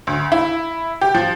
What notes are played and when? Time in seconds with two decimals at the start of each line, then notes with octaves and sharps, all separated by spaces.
0.07 D2
0.32 E4
1.01 G4
1.14 F3